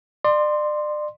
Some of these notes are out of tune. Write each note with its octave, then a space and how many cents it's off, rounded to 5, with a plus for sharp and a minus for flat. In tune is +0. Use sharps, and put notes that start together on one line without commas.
D5 +35 C6 +0